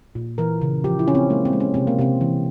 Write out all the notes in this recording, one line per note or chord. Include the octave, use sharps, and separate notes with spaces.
A#2
E3 A#4
C#3
F3 G4
E4
C#3 C#4
C4
G#3 A#3
C4
G#3
C#4
C3 C4
A#3
C3 C4
E3